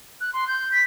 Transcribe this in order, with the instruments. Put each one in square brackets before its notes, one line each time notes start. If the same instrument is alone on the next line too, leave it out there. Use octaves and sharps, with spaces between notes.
[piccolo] F#6
C6
G6
B6